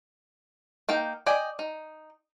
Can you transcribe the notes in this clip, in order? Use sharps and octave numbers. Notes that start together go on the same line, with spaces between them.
A#3 D#4 G5
D5 D#5 G5 G#5
D#4